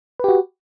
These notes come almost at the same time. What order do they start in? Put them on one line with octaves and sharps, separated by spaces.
B4 G4 F#4